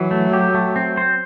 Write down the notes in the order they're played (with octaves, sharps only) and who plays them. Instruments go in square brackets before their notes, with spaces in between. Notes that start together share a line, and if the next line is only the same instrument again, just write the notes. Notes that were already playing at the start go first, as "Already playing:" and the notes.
Already playing: [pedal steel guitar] E3 [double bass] F#3
[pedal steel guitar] A3
G4
A3
C4
C5